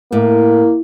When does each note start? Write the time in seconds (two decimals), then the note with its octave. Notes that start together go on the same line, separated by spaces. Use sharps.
0.12 A2 A#3